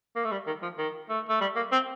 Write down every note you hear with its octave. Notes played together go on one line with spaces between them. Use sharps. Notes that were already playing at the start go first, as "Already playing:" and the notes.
A#3
A3
G3
D#3
F3
D#3
A3
A3
G3
A#3
C4